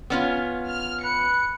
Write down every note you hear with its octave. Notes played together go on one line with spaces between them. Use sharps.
B3 C#4 F4
F6
B4 C#7